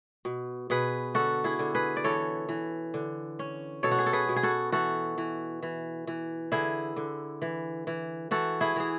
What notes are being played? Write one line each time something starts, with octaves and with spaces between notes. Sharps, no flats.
B2
B2 G#4 B4
D3 F#4 A4
E4 G#4
D3
G#4 B4
D5
E3 A4 C#5
E3
D3
C#4
B2 A4 C#5
F#4
G#4
A4
G#4 B4
B2
G#4
F#4 A4
E3 F#4 A4
E3
E3
E3
D3 E4 G#4
D3
E3
E3
E3 F#4 A4
E4 G#4
E3 G#4